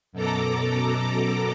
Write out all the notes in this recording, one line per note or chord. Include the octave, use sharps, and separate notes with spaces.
F#2 B2 A4 A#5 D6